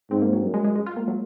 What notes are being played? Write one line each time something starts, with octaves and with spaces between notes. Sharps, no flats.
G#2 C4
A#3
F#3
F#2
G#3
G#3
G#3
F4
A#3
F#3